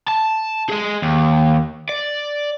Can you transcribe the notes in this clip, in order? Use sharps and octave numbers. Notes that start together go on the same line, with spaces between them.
A5
G#4 D#5
D#2
D5